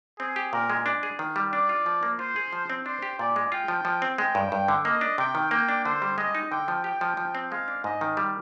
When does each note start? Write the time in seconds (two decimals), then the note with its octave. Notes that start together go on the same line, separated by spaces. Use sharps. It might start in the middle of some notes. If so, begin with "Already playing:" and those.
0.19 C4 G#4
0.36 G4
0.53 A#2 A#4
0.70 G#3
0.86 D4
1.03 G#4
1.19 D#3
1.36 G3
1.52 D4 D5
1.69 F4
1.86 F3
2.03 A#3
2.19 F4 C5
2.36 G#4
2.53 F3
2.70 C4
2.86 D4 C5
3.02 G4
3.19 A#2 D5
3.36 G#3
3.52 F4 G5
3.68 F3
3.85 F3
4.02 C4
4.18 G#3 G5
4.35 G2
4.52 G2
4.68 D3
4.85 A#3 D#5
5.01 D4
5.18 C3 G5
5.35 D#3
5.51 A#3 G5
5.69 D4
5.85 D3 C5
6.02 G3
6.18 G#3 D#5
6.35 D#4
6.51 D3 G5
6.68 F3
6.84 G4 G5
7.01 F3
7.17 F3
7.35 C4
7.51 G#3 F5
7.68 D4
7.84 G#2 D#5
8.01 D#3
8.17 G3